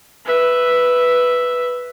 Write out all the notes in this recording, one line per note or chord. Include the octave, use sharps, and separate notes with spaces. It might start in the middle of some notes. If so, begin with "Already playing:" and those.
B4 E5